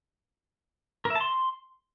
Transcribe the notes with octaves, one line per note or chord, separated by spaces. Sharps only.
A#4
E5
A5
C6